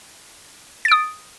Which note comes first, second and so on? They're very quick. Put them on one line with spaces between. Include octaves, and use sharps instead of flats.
A6 D7 D#6